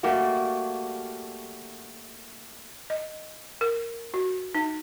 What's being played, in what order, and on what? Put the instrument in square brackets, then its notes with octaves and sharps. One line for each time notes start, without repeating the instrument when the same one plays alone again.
[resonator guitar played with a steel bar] G3 A3 A#3 F#4 G4
[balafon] D#5
A#4
F#4
D#4